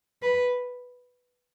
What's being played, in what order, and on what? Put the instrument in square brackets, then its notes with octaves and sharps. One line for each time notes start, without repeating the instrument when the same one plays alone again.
[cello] B4